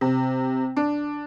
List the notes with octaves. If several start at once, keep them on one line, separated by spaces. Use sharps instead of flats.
C3
D4